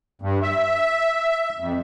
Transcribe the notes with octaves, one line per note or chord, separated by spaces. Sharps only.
G2
E5
F2